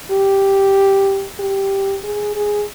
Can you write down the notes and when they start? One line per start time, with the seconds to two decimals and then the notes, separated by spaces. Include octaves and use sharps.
0.11 G4
1.39 G4
2.04 G#4
2.35 G#4